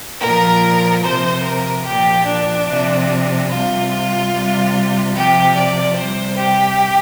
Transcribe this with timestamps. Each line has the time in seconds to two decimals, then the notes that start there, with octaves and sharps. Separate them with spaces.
0.20 A#2 F3 A#4
1.02 C3 F3 C5
1.43 A#4
1.85 A#2 F3 G4
2.25 D4
2.66 C3 F3
3.49 C3 G3 F4
3.90 F4
4.31 C3 G3
5.14 C3 F3 G4
5.55 D5
5.95 C3 G3 C5
6.37 G4